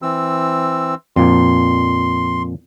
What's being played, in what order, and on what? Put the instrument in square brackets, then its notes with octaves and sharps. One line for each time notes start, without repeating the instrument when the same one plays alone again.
[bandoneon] E3 C4 E6
[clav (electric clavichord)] F2 A#2 [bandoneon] C6